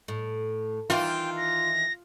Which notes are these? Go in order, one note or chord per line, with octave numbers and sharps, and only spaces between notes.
A2
D#3 E3 F4 G5
A#6